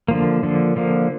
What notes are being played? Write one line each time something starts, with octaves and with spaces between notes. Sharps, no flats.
D3 F3 A#3
D3 F3 A#3
D3 F3 A#3